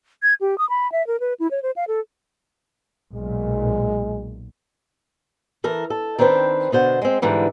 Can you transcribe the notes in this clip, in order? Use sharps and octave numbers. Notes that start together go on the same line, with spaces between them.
G#6
G4
D#6
B5
E5
A#4
B4
E4
C#5
C5
F5
A4
B1 A#2 G#3
E3 A4 A#4
A4
D#3 C4 D4 B4 C5
B2 D3 C5 F#5
G#3 C4
G#2 D3 E3 G3